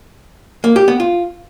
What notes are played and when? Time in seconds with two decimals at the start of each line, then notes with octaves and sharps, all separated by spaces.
0.64 A#3
0.76 G4
0.88 B3
1.00 F4